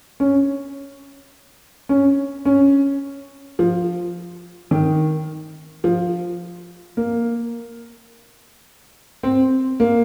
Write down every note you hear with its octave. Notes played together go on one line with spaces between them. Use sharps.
C#4
C#4
C#4
F3
D#3
F3
A#3
C4
A#3